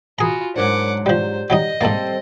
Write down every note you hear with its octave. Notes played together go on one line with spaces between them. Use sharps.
F4 F#4 G#4 G#5 A#5 B5
G#2 F#3 D4 A#4 C5 C#5 F#5 D6
F3 G3 G4 C5 D5 G6
F#3 G3 D#4 D#5
G#2 G3 A#3 C4 A4 A6